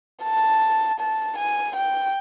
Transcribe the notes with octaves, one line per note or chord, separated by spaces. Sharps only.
A5
A5
G#5
G5